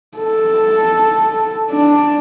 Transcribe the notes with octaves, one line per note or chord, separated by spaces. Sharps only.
A4
D4